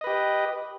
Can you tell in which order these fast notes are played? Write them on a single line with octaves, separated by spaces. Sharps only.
D#5 B4 G4